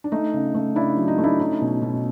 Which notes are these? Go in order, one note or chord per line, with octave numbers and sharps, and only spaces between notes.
D4
A3 D#4
C#3
A3
C#3 D4 E4
F#3
D#4
A3
D4 E4
C#4 D#4
B2
B2